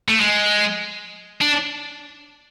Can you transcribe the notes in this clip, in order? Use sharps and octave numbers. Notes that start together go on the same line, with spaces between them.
A3
G#3
D4